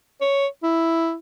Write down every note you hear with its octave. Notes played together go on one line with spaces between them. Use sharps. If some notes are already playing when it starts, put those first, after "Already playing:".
C#5
E4